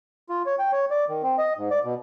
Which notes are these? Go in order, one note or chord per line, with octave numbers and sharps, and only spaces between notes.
F4
C#5
G5
C#5
D5
D#3
C4
D#5
G#2
D5
B2